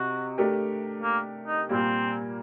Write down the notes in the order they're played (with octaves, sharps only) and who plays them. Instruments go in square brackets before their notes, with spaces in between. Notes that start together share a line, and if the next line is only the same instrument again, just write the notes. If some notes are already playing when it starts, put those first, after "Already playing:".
Already playing: [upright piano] C3 D#4 [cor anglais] F#4
[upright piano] A3 D4 G4 A#4
[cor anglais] A#3
D#4
[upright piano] A#2 G3 A#3 [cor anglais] C4